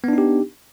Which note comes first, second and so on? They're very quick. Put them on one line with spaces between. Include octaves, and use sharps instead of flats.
B3 D4 D#4 G4